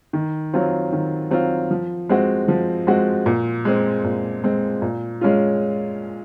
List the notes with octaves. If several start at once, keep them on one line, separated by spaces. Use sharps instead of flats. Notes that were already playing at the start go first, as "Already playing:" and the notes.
D#3
F#3 C4 F4
D#3
F#3 C4 F4
F3
G#3 C4 F#4
F3
G#3 C4 F#4
A#2
G#3 C4
A#2
G#3 C4
A#2
G#3 C#4 F4